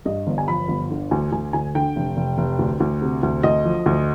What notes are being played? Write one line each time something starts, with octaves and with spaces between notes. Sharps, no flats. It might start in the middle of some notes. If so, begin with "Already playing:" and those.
G2 D#5
G1
G#5
F3 B5
G1
D3
D2 G#5
D2 G#5
D2 G#5
D3 G5
F1
F1
F1
D2
D2
C3
D2
D2 D#5
F3
D2